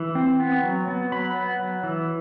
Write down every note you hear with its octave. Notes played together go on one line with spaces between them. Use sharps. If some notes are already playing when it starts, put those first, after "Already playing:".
Already playing: E3
C4
B3
F#3
B3
F#3 B5
B3
F#3
E3